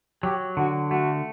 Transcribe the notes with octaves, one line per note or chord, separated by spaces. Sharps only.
F#3 G4
D3 F#4
A3 F#4